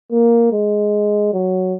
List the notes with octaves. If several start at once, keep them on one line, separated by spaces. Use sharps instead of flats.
A#3
G#3
F#3